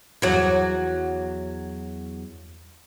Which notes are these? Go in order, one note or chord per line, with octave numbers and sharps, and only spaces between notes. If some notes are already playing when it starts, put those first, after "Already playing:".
E2 F#3